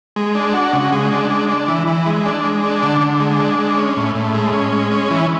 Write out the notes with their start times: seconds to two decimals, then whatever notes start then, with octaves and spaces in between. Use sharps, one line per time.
0.16 G#3
0.35 D4
0.54 F#4
0.73 C#3
0.92 G#3
1.12 D4
1.30 G#3
1.49 D4
1.68 E3
1.87 E3
2.06 G#3
2.26 D4
2.44 G#3
2.64 D4
2.83 D3
3.01 D3
3.20 G#3
3.40 D4
3.59 G#3
3.77 C#4
3.97 A2
4.15 A2
4.34 G#3
4.53 C#4
4.72 G#3
4.91 C#4
5.10 E3